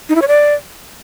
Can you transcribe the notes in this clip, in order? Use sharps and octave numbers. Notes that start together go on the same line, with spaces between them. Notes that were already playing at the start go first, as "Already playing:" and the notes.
D#4
E4
C#5
D5